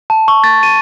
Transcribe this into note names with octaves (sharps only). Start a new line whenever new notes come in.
A5
C#6
A6
D#7